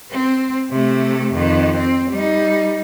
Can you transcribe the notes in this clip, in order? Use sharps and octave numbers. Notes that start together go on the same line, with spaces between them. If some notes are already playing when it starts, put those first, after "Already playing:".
C4
C3 A3
F2 D#3
C4
G3 D#4